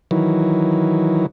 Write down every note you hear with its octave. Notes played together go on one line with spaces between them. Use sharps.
D#3 E3 F#3